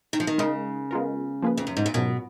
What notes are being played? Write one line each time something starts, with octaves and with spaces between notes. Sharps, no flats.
D#3
F3
D#3
C#3 G#3 D#4 A#4 D#5
G#3 B3 F4 A#4
F3 A#3 F4 G#4 B4
F2
F#2
G#2
A#2
G#2 B2 F#3 C#4 F4 A#4